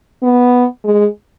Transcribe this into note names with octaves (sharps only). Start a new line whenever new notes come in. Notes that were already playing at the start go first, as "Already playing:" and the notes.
B3
G#3